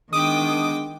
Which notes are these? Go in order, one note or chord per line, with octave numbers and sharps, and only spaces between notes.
D#3 G#3 B3 D4 G5 D6 D#6